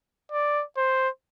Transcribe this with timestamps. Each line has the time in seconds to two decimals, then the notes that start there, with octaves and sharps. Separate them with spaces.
0.32 D5
0.77 C5